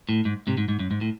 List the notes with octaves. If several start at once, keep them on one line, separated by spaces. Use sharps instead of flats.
A2
G#2
G#2 C3
G#2
G#2
F#2
G#2
A2